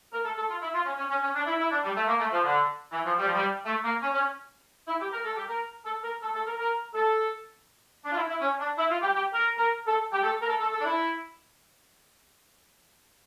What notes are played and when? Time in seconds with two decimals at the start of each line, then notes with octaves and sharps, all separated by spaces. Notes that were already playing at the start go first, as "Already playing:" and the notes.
0.13 A#4
0.24 A4
0.37 A4
0.49 F4
0.61 E4
0.74 F4
0.86 C#4
0.98 C#4
1.10 C#4
1.22 C#4
1.35 D4
1.47 E4
1.59 E4
1.71 D4
1.84 G3
1.96 A3
2.08 A#3
2.20 A3
2.32 F3
2.44 D3
2.92 E3
3.05 F3
3.18 G3
3.26 F3
3.34 G3
3.66 A3
3.84 A#3
4.03 C#4
4.14 C#4
4.88 E4
5.00 G4
5.13 A#4
5.25 A4
5.36 G4
5.48 A#4
5.85 A4
6.03 A#4
6.22 A4
6.34 A4
6.46 A#4
6.58 A#4
6.94 A4
8.05 D4
8.12 F4
8.16 E4
8.29 E4
8.41 C#4
8.59 D4
8.78 E4
8.90 F4
9.02 G4
9.15 G4
9.33 A#4
9.57 A#4
9.87 A4
10.12 G4
10.23 A4
10.42 A#4
10.48 A4
10.60 A4
10.73 A4
10.80 D4
10.84 E4